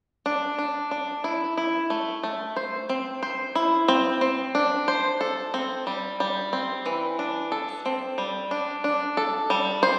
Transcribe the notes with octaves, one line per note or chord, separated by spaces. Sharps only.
D4
D4
D4
E4
E4
A3
A3
C5
C4
C5
E4
C4
C4
D4
C5
A4
C4
G3
G3
C4
E3
D4
A4
C4
G3
D4
D4
A4
G3
C5